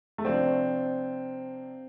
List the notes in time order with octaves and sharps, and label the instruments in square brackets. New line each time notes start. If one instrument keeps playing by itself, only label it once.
[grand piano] A3
[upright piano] C3 F3 D4 [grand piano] C4